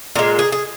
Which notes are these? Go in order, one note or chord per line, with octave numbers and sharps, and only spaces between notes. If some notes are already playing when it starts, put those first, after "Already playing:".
A#2 G#3 A#4
G#4
G#4